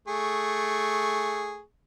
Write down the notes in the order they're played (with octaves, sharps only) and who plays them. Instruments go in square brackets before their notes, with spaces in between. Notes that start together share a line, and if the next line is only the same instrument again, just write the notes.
[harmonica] A3 G#4 C#6